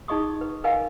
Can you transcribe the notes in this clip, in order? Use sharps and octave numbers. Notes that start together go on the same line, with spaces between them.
D#4 G#4 D#5 C#6 D#6
B4
A#4 B4 D#5 F5 G#5